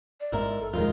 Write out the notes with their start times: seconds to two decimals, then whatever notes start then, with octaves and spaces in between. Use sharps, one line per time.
0.20 D5
0.33 G#1 G#2 E4 A#4
0.60 A4
0.73 D#1 F2 D#3 G#3 F4 A#4